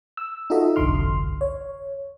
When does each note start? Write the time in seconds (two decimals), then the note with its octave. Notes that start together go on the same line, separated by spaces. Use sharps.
0.17 E6
0.50 D#4 F4 F#4 A4 D#5 E5
0.76 G1 C2 F2 D3 C6 F6
1.41 C#5